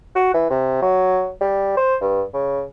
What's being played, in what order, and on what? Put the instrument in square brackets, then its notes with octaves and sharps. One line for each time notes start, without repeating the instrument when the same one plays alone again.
[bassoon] F#4
E3
C3
F#3
G3
C5
G2
C#3